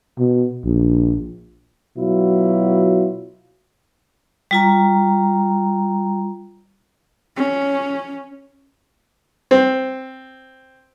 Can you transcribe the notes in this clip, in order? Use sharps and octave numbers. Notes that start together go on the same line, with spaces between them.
B2
A#1
B2 F#3 E4 F4
G3 F4 A#5
C#4
C4